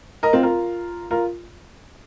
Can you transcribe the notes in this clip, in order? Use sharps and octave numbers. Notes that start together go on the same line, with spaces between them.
A#4 D#5
C4 F4
F4 A#4
F4 A#4